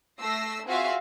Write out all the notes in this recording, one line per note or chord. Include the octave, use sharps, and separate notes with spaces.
A3 E6 A#6 C7
C4 F4 F#4 G#4 E5 F5